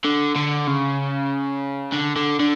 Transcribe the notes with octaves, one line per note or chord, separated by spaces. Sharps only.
D3
D3
C#3
D3
D3
D3